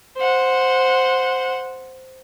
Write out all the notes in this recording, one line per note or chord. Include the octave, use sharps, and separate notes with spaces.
C5 F#5